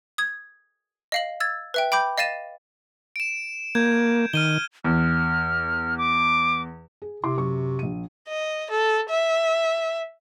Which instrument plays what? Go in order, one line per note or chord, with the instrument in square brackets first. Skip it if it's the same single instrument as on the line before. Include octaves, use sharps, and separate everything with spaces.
[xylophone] D#6 G#6
D#5 F5 F#7
E6 G#6 A6
B4 E5 G5
G5 B5 D6 G6
D#5 F5 A6 D#7 E7
[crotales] D7 E7
[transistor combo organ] A#3 [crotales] G6 G#6
[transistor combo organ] D#3 [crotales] F6 D#7 G7
[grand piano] E2 [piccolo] F6
[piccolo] D6
[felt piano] G#4
[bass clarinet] C3 [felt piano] E4 C6 D6
[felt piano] F#2 C#6
A#1 D#7
[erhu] D#5
A4
E5